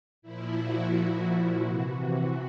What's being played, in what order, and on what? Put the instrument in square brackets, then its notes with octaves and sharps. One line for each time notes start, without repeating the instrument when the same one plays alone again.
[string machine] A#2 F3 E4
F#4
F#4
C3 E3